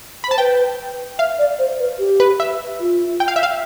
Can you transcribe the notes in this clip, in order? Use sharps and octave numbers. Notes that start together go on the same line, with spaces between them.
B5
C5 A5
B4 G5
E5 F5
D5
C5
B4
G4
B4
E5
F4
G5
F5
E5
F5